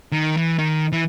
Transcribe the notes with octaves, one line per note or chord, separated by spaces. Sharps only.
D#3
E3
D#3
E3